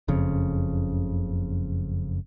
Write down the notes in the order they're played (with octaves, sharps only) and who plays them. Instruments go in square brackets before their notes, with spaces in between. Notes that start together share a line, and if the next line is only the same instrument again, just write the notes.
[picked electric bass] F#1 F2 C#3